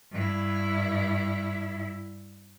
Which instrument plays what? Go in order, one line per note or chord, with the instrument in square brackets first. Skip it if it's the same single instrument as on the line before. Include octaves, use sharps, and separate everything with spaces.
[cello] G2 E4